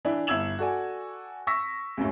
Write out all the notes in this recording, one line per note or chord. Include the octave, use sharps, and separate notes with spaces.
E3 D4 E4
G1 E4 E6 G#6 E7 F#7
F#4 A4 D5 G#5
C#6 E6 A#6 B6
C#2 F#2 A2